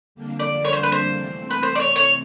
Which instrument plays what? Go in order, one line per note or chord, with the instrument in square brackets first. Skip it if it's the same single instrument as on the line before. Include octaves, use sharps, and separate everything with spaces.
[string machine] F2 D3 G3 A#3 D4
[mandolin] D5
C#5
C5
B4
C5
[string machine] C3 E3 A3 C4
[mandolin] B4
C5
D5
C#5
C#5